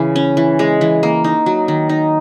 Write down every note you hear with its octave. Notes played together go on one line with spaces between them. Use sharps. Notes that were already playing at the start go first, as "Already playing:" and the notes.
Already playing: C#3 E3
C#4
E3
G#3
E3
A#3
D#4
F#3
D#3
D#4